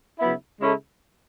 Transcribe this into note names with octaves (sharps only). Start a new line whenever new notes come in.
C#3 F#3 B3 E4
C#3 G#3 C#4 E4 A4